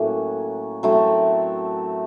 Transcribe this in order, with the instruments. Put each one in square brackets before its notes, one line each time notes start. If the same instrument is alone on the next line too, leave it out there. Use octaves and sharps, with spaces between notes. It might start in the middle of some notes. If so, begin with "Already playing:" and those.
Already playing: [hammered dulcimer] A2 F#3 A#3 C#4
F#3 A3 C4 E4